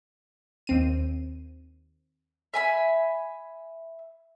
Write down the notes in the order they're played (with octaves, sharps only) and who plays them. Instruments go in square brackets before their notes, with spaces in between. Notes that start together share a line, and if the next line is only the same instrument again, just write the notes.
[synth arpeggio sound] D#2 C4 D#7
[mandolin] E5 G#5 B5